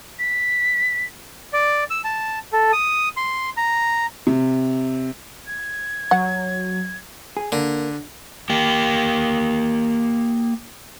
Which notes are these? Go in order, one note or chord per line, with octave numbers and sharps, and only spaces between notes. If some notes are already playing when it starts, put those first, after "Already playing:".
B6
D5
E6
A5
A4
D#6
C6
A#5
C3
G#6
F#3 F#5
G#4
D3 A#3
A#3 G4